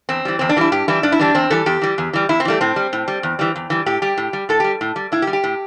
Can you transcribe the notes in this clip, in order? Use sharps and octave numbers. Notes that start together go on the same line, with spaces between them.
E2 C4
E3 G3
E2 C4
D4
E3 G3 E4
G2 G4
E3 G3 E4
G2 D4
E4
E3 G3 D4
E2 C4
E3 G3 A4
E2 G4
E3 G3
E2
E3 G3
E2 E4
C4
E3 G3 A3
A2 C4
G3
A2
G3
E2
E3 G3
E2
E3 G3
A2 G4
G3 G4
A2
G3
A2 A4
G3 G4
A2
G3
A2 E4
G4
G3
G4
A2